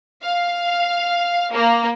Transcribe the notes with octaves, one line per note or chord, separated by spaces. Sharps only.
F5
A#3